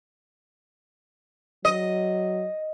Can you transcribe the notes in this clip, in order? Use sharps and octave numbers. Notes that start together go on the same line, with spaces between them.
F#3 D#5